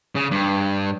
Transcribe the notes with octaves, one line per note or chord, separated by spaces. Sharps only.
C#3
G2